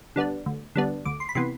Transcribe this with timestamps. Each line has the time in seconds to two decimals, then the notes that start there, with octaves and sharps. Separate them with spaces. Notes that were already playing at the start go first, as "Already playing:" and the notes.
0.16 D3 G3 B3 D4
0.46 D2
0.76 D3 G3 B3 D4
1.05 D2 D6
1.20 C6
1.29 B5
1.35 C3 E3 B3 C6